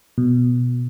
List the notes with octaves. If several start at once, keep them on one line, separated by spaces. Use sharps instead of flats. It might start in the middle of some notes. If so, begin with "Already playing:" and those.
B2